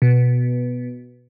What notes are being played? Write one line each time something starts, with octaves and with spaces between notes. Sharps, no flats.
B2